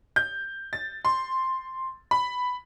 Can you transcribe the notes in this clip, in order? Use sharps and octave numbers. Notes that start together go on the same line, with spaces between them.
G6
A6
C6
B5